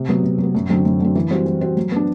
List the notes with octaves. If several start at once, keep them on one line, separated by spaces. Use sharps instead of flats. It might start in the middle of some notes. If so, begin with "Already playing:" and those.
Already playing: C3
F#3 B3
C3
F#3
B3
F#2
D3 F#3 C4
F#2
D3 F#3 C4
E3
G3 C4 F#4 C5
E3
G3 C4 F#4 C5
F#3
B3 D4